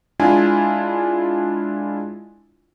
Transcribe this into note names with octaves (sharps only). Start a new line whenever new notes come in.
G#3 D4 E4 F4 G#5